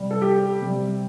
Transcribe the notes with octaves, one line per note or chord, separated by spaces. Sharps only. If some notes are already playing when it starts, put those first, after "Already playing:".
Already playing: C3 G3
A4
G4
C3 G3